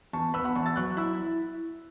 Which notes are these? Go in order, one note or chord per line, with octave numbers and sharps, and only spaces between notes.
E2 A5 C#6
B3 B5 E6
F#5 B5
E2 A5 C#6
E6 A6
F#3 C#6 F#6
E4 B5 E6